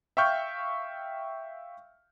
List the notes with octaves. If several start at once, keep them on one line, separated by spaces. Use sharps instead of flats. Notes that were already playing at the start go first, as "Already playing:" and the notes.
E5 F5 G5 C#6 F6 G6